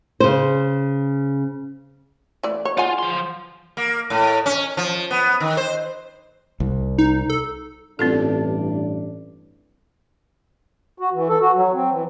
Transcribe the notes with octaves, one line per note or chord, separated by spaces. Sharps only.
C#3 C5
E3 A3 D5
C#5
F4 G#4 F#5 G#5
F3 C6
A#3
A2
C#4
F3
B3
D#3
C5
C2
D#4
A4
A1 G2 C4 D4 F4 A4
F#4
E3
A4
F#4
F#3
C4
E3